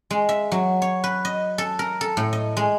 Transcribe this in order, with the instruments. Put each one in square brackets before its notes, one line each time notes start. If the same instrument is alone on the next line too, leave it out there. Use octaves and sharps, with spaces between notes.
[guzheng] G#3
E5
F#3
C#5
B4
D#5
A4
A#4
A4
A2
D#5
G#3